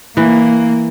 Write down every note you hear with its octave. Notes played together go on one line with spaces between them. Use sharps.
E3 A#3